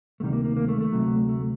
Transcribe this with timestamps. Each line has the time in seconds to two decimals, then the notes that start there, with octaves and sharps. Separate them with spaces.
0.20 D2 C3 D#3 G3 A3
0.33 A#3
0.44 A#3
0.57 A#3
0.68 A3
0.81 A3
0.92 D2 C3 F#3
1.29 A3